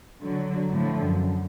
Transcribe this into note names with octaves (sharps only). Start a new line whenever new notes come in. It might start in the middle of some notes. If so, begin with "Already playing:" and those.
D3 F#3
A2 D3 F3
F#2